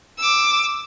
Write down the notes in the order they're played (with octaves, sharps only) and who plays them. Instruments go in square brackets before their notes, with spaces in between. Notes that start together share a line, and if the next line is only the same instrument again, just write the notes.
[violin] D6 E6